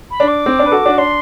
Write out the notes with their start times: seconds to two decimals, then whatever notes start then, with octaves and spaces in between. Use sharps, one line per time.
0.11 B5
0.20 D4
0.28 D6
0.46 C4
0.59 D4
0.66 B4
0.72 F#4 A4
0.86 D4 F#4
0.98 D4 C6